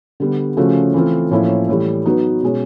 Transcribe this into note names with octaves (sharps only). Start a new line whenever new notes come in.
D3 G3 B3
C#3 F3 A3 C#4 F#4
E3 A3 C4 F4 A4
A2 F3 A#3 C#4 E4
A2 E3 G3
F#3 B3 D#4 F#4 B4
B2 G#3 C#4